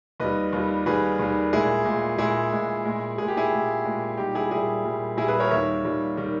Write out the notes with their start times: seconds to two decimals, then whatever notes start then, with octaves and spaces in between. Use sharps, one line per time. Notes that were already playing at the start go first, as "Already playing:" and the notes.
0.20 D#2 D#3 G3 B4 D#5
0.53 D#2 D#3 G3
0.86 D#2 D#3 G3 G#4 B4
1.19 D#2 D#3 G3
1.53 A#2 G#3 E4 G#4
1.85 A#2 G#3
2.18 A#2 G#3 E4 G#4
2.53 A#2 G#3
2.85 A#2 G#3
3.18 A#2 G#3 G#4
3.28 G4
3.37 E4 G#4
3.52 A#2 G#3
3.86 A#2 G#3
4.18 A#2 G3 D#4 G4
4.35 E4 G#4
4.51 A#2 G3 E4 G#4
4.85 A#2 G3
5.17 A#2 E4 G#4
5.22 G3
5.28 G#4 B4
5.40 A#4 C#5
5.51 D#2 D#3 G3 C#5 E5
5.84 D#2 D#3 G3
6.17 D#3 G3